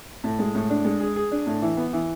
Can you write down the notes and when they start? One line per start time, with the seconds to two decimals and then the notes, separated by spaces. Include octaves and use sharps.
0.24 A2
0.39 G#3
0.55 A2
0.70 D4
0.85 G#3
1.00 G#4
1.16 G#4
1.32 D4
1.46 A2
1.62 E3
1.77 B3
1.93 E3